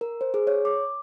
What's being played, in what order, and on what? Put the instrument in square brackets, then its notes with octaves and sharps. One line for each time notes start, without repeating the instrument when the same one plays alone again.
[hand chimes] A#4
C5
G#4
C#5
D6